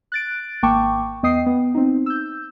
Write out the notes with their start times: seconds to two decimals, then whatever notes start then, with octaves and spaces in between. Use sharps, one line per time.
0.12 F#6 A6 D7
0.63 G#1 A#3 G5 A5 C#6 D6
1.23 E2 B3 D#5 G5 D#6 C7
1.46 B3
1.74 C4 D#4
2.06 E6 G6